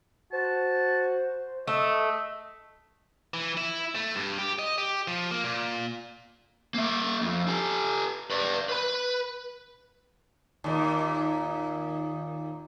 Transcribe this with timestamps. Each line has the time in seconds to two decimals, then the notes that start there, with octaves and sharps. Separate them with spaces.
0.33 F#4 C5 A5
1.67 A3 D#5 E5 E6
3.34 E3
3.57 E4
3.95 A3
4.15 G2
4.39 G4
4.59 D#5
4.78 G4
5.08 F3
5.31 A#3
5.44 A#2
6.74 A#3 E5
7.21 F2
7.48 G4 A4
8.30 B4 D5
8.69 B4 B5
10.64 D#2 A#2